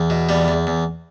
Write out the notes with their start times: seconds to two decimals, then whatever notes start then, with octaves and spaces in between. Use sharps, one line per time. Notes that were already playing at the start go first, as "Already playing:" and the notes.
Already playing: E2
0.10 B2
0.29 E2 G3
0.48 E2
0.67 E2